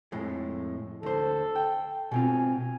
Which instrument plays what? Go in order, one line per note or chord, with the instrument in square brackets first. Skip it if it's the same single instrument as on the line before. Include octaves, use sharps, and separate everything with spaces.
[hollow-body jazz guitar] F2 A2 G#3
[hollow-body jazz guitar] D2 C5 [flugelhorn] A4
[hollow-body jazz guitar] G5
[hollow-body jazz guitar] B2 C4 F4 [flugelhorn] G#5